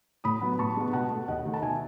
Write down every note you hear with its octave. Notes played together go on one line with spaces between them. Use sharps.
A2 B5 D#6
F#3 B3
A2 A5 C#6
G#3 B3
B2 F#5 A5
A3
D#2 D#5 F#5
D#3 A3
A5
B2 E5 G#5